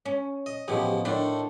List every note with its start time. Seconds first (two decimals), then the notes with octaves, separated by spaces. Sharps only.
0.05 C#4
0.46 D#5
0.68 A1 B2 F3 G4 G#4
1.05 A2 D3 D#3 D4